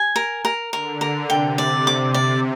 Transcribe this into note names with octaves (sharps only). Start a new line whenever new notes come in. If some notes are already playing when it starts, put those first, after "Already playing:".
Already playing: G#5
A#4
A#4
D3 A#4
A#4
C3 G5
D5
D6
D5